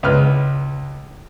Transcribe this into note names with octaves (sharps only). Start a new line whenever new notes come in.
C#2 B4 F6